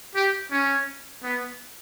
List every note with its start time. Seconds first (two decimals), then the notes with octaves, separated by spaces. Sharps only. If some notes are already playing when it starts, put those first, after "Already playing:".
0.15 G4
0.51 C#4
1.23 B3